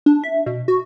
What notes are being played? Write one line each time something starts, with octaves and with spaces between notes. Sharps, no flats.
D4
E5
B2
F#4